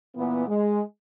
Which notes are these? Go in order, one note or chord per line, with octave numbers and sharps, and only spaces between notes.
A#2 E3 B3
G#3